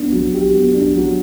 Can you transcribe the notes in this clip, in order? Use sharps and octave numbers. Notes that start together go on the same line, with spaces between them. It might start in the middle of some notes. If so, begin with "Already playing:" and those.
Already playing: B3 D4
F#3
G4
B3
D4
F#3